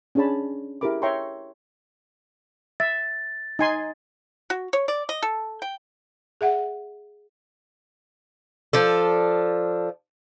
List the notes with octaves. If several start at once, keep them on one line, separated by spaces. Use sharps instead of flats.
C#4 D4 G#4 C#5 A5 B5
E4 G4 G#4 A#4 B5 D6
C#5 E5 G5 A#5 C6 C#6
E5 A6
D#4 G#5 C6
F#4
C#5
D5
D#5
A4
G5
G#4 E5 F#5
F3 D4 A4